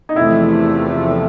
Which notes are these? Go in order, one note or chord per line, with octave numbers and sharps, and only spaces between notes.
D#4
E2 C3 F3 A3 E4